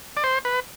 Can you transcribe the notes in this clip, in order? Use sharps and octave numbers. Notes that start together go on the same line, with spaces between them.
D5
C5
B4